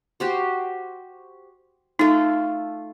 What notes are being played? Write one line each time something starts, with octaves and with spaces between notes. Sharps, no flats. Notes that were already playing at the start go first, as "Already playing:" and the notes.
F#4 G4 C5
A3 D#4 F4